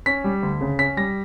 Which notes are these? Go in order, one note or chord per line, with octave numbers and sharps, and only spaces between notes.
C#4 B6
G3
D2
C#3
C#4 B6
G3 A#6